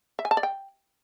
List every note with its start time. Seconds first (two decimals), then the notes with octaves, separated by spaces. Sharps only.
0.19 E5
0.25 G#5
0.31 A5
0.37 D5
0.43 G5